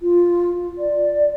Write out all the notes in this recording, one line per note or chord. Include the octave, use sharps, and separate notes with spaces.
F4
D5